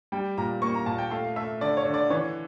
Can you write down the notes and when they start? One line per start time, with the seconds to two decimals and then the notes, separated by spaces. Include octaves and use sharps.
0.12 G3 G5
0.38 A#2 A#5
0.62 A#3 C#6
0.74 A#5
0.86 A#2 A5
0.98 G5
1.11 A3 F5
1.36 A3 E5
1.61 D3 D5
1.77 C#5
1.85 D3
1.94 D5
2.10 E3 C#5